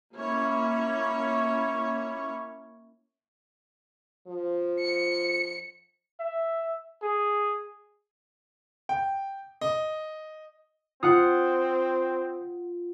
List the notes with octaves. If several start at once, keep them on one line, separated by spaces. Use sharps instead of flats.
A#3 C#4 E4 C#5
F3
C#7
E5
G#4
G5
D#5
C4 F4 F#5 D#6